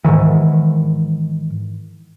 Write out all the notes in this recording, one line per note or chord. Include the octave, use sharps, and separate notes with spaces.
G#2 C3 D#3 E3